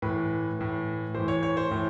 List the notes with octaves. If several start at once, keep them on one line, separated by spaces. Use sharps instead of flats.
A2 E3 B4
A2 E3
E3 C5
A2
C#5
C#5
C5
A2 E3